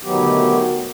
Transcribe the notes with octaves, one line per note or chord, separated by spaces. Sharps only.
D2 B2 D#3 F#3 B3 G4